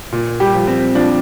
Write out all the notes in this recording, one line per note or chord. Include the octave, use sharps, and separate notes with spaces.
A#2
G3 G4
F3
C4
F3 D4